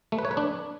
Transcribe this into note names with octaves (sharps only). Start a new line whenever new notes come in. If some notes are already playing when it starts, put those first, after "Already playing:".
A3
B4
C#5
B4
D4